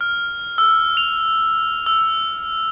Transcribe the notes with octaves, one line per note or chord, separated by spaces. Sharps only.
F6
E6
F7
E6